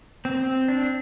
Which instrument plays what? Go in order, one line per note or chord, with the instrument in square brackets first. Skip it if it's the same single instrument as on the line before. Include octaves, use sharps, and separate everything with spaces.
[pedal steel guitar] C4
C4
D4